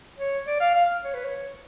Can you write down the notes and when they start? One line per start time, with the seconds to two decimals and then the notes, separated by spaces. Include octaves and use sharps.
0.18 C#5
0.47 D5
0.60 F5
0.75 F5
1.04 C#5
1.14 B4
1.25 C#5